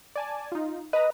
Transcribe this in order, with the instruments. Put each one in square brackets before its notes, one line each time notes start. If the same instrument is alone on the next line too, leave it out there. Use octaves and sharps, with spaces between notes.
[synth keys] D5 G#5 A5
D#4 F4
[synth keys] B4 A#5 [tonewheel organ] D#5